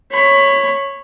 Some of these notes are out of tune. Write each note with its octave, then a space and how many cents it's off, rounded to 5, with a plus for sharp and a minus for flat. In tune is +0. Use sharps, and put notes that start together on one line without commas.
C#5 -10 B5 +15